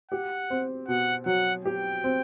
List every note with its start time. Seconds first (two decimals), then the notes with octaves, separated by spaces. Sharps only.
0.11 G4 F#5
0.50 C4
0.88 B2 F#5
1.26 F#3 F#5
1.65 G4 G5
2.04 C4